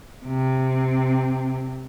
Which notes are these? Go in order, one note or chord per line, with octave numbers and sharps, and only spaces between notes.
C3 C4